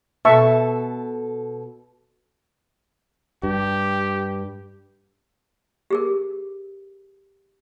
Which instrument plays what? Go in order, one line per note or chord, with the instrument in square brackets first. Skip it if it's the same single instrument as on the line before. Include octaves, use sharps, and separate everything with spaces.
[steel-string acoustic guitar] B2 A4 [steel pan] E5 A5 C#6
[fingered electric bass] G2 [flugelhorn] G4
[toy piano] G4 G#4 A#4